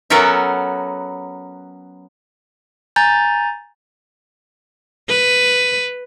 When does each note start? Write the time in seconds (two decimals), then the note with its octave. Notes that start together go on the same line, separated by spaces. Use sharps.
0.10 F#3 B3 C#4 A4 A#4 E5
2.96 G#5 A#5 G6 A6
5.09 B4